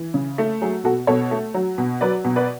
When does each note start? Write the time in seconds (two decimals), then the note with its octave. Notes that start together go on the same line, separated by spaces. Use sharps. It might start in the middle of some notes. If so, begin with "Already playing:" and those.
Already playing: E3
0.14 C#3
0.38 A3
0.62 F#3 G#4
0.84 B2 F#4 A4
1.07 B2 A4 C#5
1.31 A3
1.54 F#3
1.78 B2
2.01 F#3 B4 D5
2.25 B2
2.36 B4 D5